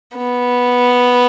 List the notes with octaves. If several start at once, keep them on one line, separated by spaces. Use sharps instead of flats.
B3